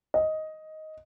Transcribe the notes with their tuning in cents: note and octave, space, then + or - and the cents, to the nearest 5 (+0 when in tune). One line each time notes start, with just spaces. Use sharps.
D#5 +10